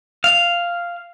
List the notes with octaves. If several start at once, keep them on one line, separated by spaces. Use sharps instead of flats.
F5